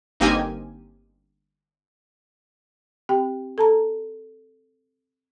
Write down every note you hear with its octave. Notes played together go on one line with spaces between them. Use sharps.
G1 A#3 C4 D#4 G4 G#5
C4 G4 G5
A4 A5 A#5